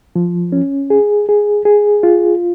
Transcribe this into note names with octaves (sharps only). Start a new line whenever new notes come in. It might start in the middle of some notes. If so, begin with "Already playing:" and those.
F3
C#4
G#4
G#4
G#4
F4